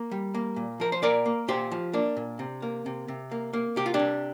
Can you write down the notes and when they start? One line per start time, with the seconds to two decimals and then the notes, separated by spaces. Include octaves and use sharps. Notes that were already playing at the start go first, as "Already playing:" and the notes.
Already playing: A#3
0.11 G3
0.35 A#3
0.56 A#2
0.80 F3 A#4
0.92 C5
1.02 A#2 A#4 D5
1.26 A#3
1.48 A#2 G4 C5
1.71 F3
1.93 A#3 D4
2.17 A#2
2.39 C3
2.62 A#3
2.86 C3
3.08 C3
3.32 A#3
3.53 A#3
3.76 C3 G4
3.86 F4
3.94 D4 G4
3.99 C3